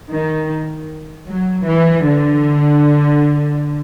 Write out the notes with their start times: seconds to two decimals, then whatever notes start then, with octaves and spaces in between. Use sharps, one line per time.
0.10 D#3
1.27 F#3
1.67 E3
2.06 D3